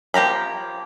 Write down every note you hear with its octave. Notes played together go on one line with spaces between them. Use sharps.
F3 A#3 G4 A#5 B5